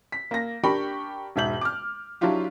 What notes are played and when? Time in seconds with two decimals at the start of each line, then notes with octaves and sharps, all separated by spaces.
0.12 B6
0.31 A#3 A#6
0.63 D4 G4 A#4 G5 B5 C#6
1.36 E1 G#2 E5 G6 F#7
1.61 D6 F6
2.21 F#3 D4 E4 F4 G4